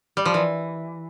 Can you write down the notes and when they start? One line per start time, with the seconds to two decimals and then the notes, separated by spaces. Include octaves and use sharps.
0.17 G3
0.25 F3
0.34 E3